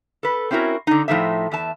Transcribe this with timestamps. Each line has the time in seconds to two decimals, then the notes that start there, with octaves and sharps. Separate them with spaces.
0.23 A4 B4
0.51 C4 C#4 E4 F#4 A#4
0.87 D3 D#4
1.08 A2 F3 A3 B3 D#4 E5
1.52 E2 E5 A5